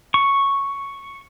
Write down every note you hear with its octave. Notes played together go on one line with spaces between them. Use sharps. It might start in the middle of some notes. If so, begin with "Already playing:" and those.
C#6